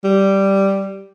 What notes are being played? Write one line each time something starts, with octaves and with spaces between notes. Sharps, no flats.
G3